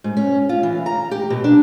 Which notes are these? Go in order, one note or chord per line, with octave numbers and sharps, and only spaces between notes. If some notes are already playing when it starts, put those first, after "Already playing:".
G#2
C#4
F4
E3
A#5
G4
B2
D4